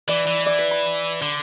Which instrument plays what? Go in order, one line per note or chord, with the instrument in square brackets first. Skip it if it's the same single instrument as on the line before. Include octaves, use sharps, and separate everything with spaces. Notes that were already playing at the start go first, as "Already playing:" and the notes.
[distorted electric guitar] E3 [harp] D5
[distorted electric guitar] E3
[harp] D5
B4
B5
[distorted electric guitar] D3